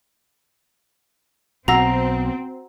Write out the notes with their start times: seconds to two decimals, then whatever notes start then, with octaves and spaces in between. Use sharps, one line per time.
1.68 B1 B2 C4 F#4 F#5 A#5 E6 A#6